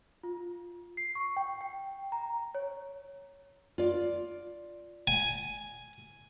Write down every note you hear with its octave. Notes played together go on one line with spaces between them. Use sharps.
F4
C7
C#6
G5
G5
A#5
C#5
F4 D5
G#5